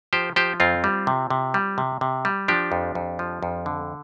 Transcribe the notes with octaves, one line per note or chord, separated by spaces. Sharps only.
F3 G4 C5
F3 G4 C5
F2 C4 F4
G3
C3
C3
G3
C3
C3
G3
F3 D4 G4
F2
F2
F3
F2
D3